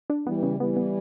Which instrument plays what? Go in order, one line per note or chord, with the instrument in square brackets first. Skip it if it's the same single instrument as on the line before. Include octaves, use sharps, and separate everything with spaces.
[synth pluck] D4
[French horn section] E3 G3 [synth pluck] B3
[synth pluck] C#3
[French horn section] E3 G3 [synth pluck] B3
[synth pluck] B3